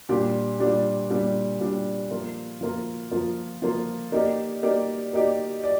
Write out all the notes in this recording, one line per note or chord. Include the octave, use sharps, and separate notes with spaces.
A#2 G3 D4 G4
A#2 G3 D4 G4
A#2 G3 D4 G4
A#2 G3 D4 G4
F3 A#3 F4
F3 A#3 F4
F3 A#3 F4
F3 A#3 F4
A#3 D#4 G4 D5
A#3 D#4 G4 D5
A#3 D#4 G4 D5
D5